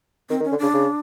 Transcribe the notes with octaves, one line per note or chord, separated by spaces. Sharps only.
D#3 C4
D#3
C#4
D3
C#3 D4
C#3